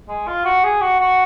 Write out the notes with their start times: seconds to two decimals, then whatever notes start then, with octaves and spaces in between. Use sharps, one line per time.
0.09 G#3
0.27 F4
0.45 F#4
0.64 G#4
0.82 F#4
1.00 F#4